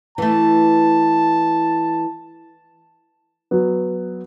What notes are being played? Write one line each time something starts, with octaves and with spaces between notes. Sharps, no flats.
E3 A3 A5
F#3 B3